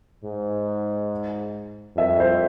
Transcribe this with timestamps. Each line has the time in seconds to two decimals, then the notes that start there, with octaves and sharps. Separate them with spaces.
0.24 G#2
1.97 F2 E5
2.20 C5